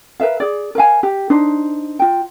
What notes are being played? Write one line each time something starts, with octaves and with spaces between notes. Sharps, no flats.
A#4 B4 E5 F5
G#4 D5
A#4 C5 F5 G#5
G4
D4 D#4 C5
F4 G5